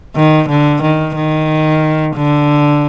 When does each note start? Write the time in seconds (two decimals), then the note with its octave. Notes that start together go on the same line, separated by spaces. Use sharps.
0.16 D#3
0.49 D3
0.82 D#3
1.16 D#3
2.16 D3